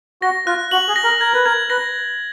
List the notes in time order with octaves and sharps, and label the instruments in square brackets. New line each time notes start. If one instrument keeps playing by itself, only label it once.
[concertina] F#4 [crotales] A#6
[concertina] F4 [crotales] F#6
[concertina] F#4 [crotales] F#7
[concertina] G#4
[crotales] A#6
[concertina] A#4
[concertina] A#4 [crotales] G#6
[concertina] B4
[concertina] A#4 [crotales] G#6
[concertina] B4 [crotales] A#6